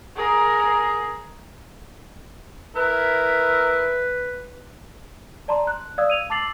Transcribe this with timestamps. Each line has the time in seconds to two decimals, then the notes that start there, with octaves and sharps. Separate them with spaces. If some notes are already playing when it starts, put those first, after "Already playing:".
0.16 G#4 A#4
2.76 E4 A#4 B4
5.48 D5 A5 A#5 C6
5.67 F#6
5.98 D5 F5 D#6 E6 G#6
6.10 D#7 F7
6.30 A5 D6 E6 A6 C7 F#7